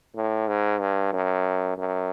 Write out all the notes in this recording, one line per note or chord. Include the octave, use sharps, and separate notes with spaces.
A2
G#2
G2
F#2
F#2